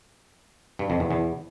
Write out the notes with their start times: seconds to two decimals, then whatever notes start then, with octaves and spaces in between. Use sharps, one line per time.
0.79 G2
0.90 F2
1.00 E2
1.11 E2